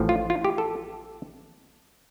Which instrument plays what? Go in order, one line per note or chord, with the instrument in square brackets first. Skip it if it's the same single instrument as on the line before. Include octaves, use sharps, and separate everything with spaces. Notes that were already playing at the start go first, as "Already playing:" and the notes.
Already playing: [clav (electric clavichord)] A1 A2 F3
F4
F4
G4
A4